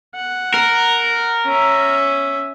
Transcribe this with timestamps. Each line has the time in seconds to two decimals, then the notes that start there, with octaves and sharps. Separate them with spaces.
0.15 F#5
0.54 A#4
1.46 C#4 E5